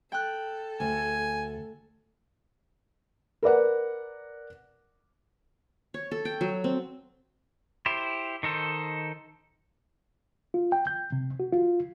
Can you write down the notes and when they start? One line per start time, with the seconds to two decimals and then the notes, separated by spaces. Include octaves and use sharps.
0.12 A4 G5 F#6
0.80 D2 G#5
3.43 A#4 B4 D5 F#5
5.94 C#5
6.11 A4
6.25 G5
6.41 F#3
6.64 C4
7.86 E4 G4 C5
8.43 D#3 D#4 A4 C5
10.54 F4
10.72 G5
10.87 G6
11.12 C3
11.40 F#4
11.53 F4